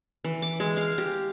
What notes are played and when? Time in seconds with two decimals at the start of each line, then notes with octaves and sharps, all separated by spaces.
0.24 E3
0.42 D6
0.60 G#3
0.77 F5
0.98 G4